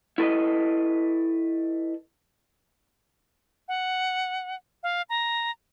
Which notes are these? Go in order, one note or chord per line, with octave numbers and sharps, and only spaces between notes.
E4 A4 B4 D#5
F#5
F5
A#5